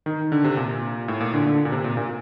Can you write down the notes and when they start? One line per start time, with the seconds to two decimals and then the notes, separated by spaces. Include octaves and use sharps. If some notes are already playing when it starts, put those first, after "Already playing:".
0.06 D#3
0.32 D3
0.44 C3
0.57 A#2
1.08 A2
1.20 A#2
1.34 D3
1.47 D3
1.65 A#2
1.72 C3
1.84 A#2
1.97 A#2